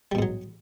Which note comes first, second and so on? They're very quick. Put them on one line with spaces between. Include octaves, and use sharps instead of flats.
G3 B2 G#2 F#3